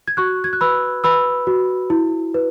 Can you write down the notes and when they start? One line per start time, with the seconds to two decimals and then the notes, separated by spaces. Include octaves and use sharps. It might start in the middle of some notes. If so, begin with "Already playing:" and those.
0.08 G#6
0.17 F#4 C#6 F#6
0.44 G#6
0.53 F#6
0.61 B4 B5 E6
1.04 B4 B5 E6
1.47 F#4
1.90 E4
2.34 B4